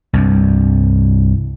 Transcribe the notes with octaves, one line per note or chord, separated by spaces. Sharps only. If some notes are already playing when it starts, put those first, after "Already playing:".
C2 G2